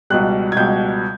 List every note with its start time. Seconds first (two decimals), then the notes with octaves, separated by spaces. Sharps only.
0.10 C#2 B2 G3 F#6
0.52 G#6
0.57 C#2 B2 G3 G6